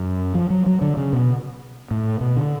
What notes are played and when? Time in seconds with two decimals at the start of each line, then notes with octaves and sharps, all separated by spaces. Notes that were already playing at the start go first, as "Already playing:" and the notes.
Already playing: F#2
0.35 F3
0.50 F#3
0.66 F#3
0.82 D3
0.97 C#3
1.13 B2
1.91 A2
2.21 B2
2.37 D3